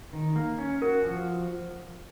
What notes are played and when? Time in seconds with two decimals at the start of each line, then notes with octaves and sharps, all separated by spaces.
0.13 D#3
0.36 A#3
0.58 C#4
0.82 F#4 A#4
1.05 F3